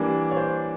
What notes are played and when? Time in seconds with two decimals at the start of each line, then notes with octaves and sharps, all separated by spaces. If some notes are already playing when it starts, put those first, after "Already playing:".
Already playing: E3 G3 A#3 D4
0.31 C#5
0.37 C5